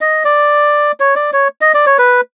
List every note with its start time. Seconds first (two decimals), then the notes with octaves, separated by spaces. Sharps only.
0.01 D#5
0.25 D5
1.00 C#5
1.16 D5
1.33 C#5
1.61 D#5
1.74 D5
1.86 C#5
1.99 B4